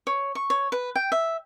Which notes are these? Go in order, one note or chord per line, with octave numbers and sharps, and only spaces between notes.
C#5
C#6
C#5
B4
G5
E5